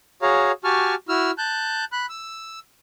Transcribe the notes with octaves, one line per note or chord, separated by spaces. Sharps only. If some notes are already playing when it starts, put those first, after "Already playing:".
F#4 G#4 C#5 F5 A#5
F#4 G4 G#5 A5 C#6 F6
E4 F#4 E6 F6
A5 F#6 G6
B5 F#6
E6